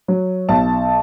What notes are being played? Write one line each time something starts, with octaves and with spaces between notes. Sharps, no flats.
F#3
B1 A5